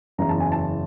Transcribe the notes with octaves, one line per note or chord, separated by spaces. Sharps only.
F#1 E2 C#3 A#5
A5
G#5
A5